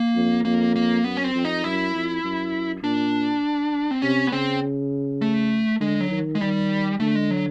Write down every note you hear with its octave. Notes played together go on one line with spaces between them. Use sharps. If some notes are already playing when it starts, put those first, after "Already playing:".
Already playing: A#3
F2
F2 A#3
A#3
F#2 B3
C#4
C4
F2
D#4
F#2 E4
F2
F#2
A#2 D4
C4
C3 C#4
B3
C#3 C4
A3
D3 G#3
F#3
D#3
G#3
D#3 G3
D3 A3
G#3
F#3